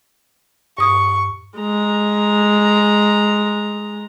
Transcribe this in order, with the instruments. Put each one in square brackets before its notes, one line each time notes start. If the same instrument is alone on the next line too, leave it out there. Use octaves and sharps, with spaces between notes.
[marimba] G2 D#6 [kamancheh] C#6
[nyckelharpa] G#3 A#5